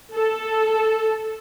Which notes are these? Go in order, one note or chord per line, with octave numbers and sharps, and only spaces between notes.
A4